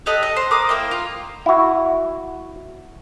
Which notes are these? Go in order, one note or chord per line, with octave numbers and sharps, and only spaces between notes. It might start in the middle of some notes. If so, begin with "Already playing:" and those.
G4 A4 D#5 F#6
D#5
C5
A#4 D6 D#6
A#3 E4 G5
F4
E4 F#4